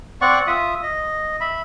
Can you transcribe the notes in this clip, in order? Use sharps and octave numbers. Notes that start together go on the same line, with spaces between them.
C4 D5 F#5 C#6
F4 E5 D#6
D#5
E5 B5